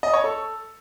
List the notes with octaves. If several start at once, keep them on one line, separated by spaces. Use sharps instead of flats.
D#5
C#5
A4